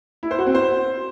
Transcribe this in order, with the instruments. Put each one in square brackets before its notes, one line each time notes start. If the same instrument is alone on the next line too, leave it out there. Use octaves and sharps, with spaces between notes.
[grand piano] E4
C5
F#4
C4
C5